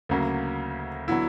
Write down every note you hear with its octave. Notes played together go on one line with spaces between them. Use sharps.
D2 C#3 F#3 A#3
D3 F#3 B3 E4